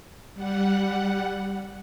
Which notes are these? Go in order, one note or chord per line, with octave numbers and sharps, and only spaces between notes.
G3 F#5